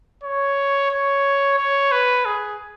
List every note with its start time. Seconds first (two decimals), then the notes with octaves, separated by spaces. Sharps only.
0.23 C#5
0.91 C#5
1.58 C#5
1.92 B4
2.25 G#4